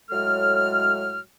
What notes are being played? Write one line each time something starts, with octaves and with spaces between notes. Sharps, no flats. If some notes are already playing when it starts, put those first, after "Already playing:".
A2 F#3 G#3 A4 F6